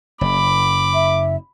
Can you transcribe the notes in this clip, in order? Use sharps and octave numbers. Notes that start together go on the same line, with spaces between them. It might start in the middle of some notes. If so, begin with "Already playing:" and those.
F#1 B5 D6
E5